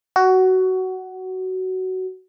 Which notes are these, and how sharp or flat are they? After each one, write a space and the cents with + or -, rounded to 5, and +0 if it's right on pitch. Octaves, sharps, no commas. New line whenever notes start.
F#4 +15